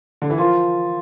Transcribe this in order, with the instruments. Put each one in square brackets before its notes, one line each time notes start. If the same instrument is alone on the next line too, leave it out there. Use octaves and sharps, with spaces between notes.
[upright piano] D3
E3
[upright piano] F3 [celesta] A#4 F5 C6